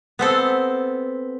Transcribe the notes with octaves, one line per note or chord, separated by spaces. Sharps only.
B3 C4 A4